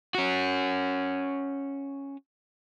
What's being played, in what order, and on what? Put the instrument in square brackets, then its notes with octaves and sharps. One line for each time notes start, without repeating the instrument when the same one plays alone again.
[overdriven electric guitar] C#4 F#4